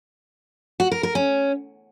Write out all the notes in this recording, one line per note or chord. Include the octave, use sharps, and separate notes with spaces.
F#4
A#4
A#4
C#4